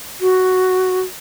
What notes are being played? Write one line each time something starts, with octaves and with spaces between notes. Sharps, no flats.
F#4